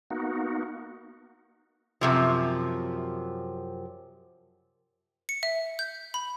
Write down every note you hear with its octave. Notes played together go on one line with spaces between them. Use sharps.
A#3 B3 D#4 F#4
F#2 C3 F3
C#7
E5
G6
B5